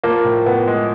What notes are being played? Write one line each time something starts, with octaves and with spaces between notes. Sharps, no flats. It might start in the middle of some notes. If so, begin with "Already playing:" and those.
F3 A#3
A2
A2 B3
G#3